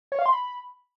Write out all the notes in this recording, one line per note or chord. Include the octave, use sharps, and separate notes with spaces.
C#5
F5
C6
B5